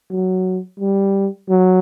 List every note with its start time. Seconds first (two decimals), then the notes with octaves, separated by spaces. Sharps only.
0.11 F#3
0.80 G3
1.49 F#3